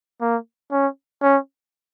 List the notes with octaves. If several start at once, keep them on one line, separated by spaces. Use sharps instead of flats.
A#3
C#4
C#4